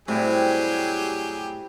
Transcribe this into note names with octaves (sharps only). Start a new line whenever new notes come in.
A2 C3 F#3 G3 E4 G4 G#4